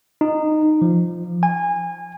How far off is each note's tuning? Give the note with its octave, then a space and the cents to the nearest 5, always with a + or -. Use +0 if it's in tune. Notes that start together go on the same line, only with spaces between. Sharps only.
D#4 -15
F3 -10
G#5 -25